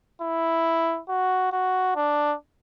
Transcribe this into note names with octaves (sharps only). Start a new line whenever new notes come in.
E4
F#4
F#4
D4